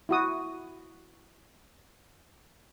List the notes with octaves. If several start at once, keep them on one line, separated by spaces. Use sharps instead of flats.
E4 F#4 D#6